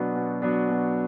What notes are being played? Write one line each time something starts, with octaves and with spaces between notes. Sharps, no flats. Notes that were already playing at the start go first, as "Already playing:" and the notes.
Already playing: B2 F#3 B3 D4
B2
F#3 B3 D4
B2